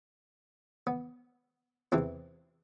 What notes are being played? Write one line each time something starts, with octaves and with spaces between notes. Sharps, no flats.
B3
E2 C3 E3 C4